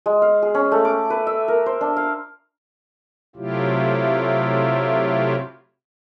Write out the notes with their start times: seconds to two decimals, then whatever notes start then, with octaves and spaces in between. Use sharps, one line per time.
0.06 G#3
0.22 F5
0.42 G#4
0.54 C#4
0.72 A3
0.85 D6
1.10 B4
1.27 E5
1.48 A#4
1.66 C5
1.81 D4
1.97 F5
3.36 C3 F#3 A3 E4 F4 G4